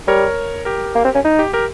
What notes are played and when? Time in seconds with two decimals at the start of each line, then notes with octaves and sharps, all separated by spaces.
0.07 G3 A#4 C#5
0.65 G4 A#4
0.95 A#3
1.05 C4
1.15 C#4
1.24 D#4
1.39 G4
1.53 G4 A#4